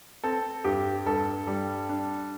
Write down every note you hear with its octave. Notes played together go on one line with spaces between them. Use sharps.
C4 A4
G2 G4
G2 A4
G3
D4